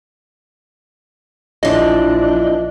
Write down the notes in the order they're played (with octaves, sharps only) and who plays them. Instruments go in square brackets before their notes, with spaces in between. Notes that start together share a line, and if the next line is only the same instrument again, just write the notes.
[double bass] A#1 D4 [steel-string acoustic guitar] E3 F3 [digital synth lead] D#5